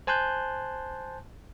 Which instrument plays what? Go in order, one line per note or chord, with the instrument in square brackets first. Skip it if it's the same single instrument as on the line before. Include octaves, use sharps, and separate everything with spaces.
[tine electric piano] C5 G#5 A5 C6 F#6 G6